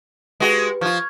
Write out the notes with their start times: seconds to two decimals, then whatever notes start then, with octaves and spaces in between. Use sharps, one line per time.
0.40 G#3 F#4 G4 B4
0.81 F3 F4 C#6 F6 G#6